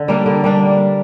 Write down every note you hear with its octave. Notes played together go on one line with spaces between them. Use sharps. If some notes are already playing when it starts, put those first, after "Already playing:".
Already playing: D3
G3 A#3 D4
D3
G3 A#3 D4